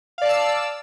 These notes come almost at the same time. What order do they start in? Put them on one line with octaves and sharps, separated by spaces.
F5 D5 A5 E6